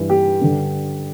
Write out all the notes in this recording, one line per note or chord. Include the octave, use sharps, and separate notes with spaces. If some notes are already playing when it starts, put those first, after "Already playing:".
Already playing: G2 E3
G4
G2 D3